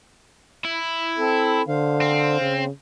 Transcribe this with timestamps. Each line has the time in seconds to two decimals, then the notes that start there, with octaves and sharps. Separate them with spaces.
0.65 E4
1.18 C4 A4
1.68 D3 C5 F5
2.01 C4
2.41 C#3